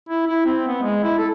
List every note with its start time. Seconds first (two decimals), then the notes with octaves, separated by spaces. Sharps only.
0.09 E4
0.27 E4
0.46 C4
0.68 B3
0.82 G#3
1.04 E4
1.18 A4